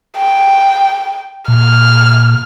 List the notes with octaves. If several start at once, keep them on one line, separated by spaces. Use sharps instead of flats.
G5
A#2 F6